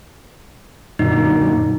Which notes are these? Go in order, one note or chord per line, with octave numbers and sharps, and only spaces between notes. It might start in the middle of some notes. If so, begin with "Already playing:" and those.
F#2 A#2 D3 D#4